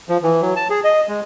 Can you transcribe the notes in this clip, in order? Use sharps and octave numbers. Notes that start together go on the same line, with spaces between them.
F3
E3
F#3
A5
G#4
D#5
G#3